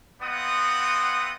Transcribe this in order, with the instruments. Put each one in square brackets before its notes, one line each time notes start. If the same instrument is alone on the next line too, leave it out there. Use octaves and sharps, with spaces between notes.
[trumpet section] B3 C4 F4 D#5 F#5 D#6